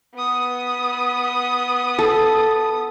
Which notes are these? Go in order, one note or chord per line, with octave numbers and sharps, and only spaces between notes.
B3 D#6
A4